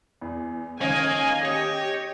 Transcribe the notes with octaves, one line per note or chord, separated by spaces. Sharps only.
E2
D#3 A#3 C#4 D#5 G#5
G4 C#5